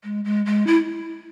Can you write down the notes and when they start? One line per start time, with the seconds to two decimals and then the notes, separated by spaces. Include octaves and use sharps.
0.04 G#3
0.25 G#3
0.46 G#3
0.67 E4